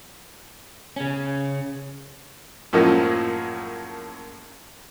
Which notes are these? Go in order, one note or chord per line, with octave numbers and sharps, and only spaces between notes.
C#3 C#4
F#2 A2 F3 G#3 A#3 C#4